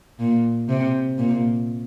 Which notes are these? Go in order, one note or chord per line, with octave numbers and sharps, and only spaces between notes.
A#2
C3
A#2